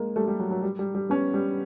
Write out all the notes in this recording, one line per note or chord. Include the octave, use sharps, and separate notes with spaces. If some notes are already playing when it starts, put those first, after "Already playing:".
Already playing: G#3 A#3
G3 A3
G3
F#3
F#3
G3
G3
G3
B3 C#4
G3